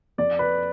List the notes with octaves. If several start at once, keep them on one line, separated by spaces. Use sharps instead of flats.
F2 D5
B4